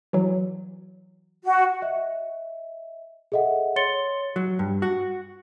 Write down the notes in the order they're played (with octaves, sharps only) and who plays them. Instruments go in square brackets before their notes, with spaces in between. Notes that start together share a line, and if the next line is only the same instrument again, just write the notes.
[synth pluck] E3 F#3
[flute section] F#4
[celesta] D#5 E5
G#4 A4 D#5 E5 F#5
C#5 C6 A6 C#7 G7
[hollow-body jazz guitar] F#3
G2
F#4